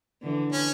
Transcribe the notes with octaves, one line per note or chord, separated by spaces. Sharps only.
D3 E3
C#4